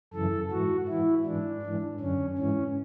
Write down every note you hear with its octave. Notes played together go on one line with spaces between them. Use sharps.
F#2 C#3 E3 A4
G#2 E3 F#4
G#2 E3 E4
G#2 E3 D4
G#2 E3
F#2 D3 C#4
G#2 E3 C#4